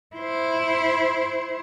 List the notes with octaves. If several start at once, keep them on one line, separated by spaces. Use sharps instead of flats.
E4 C5